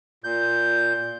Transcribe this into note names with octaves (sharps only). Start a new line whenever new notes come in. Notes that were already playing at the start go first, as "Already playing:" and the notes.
A#2 G6